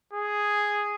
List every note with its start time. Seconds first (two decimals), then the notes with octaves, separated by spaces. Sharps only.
0.13 G#4